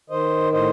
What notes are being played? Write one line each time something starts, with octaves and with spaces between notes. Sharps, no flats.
D#3 C5 D#5
A2 C5 D#5